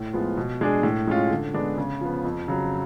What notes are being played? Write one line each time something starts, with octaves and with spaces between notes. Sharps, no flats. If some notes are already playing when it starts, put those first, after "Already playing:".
Already playing: A2
F3 G#3 B3 F4
B2
G#3 D4 G#4
A2
G#3 C#4 F4
D3
G#3 B3 D4
C#3
F3 B3
F2
C#3 F#3